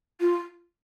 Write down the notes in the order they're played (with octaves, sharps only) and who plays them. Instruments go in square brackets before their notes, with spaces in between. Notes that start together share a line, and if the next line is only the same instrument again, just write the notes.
[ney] F4